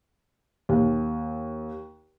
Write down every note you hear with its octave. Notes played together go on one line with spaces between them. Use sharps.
D#2